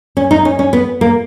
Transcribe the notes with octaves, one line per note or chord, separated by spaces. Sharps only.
C#4
D#4
C#4
C#4
B3
A#3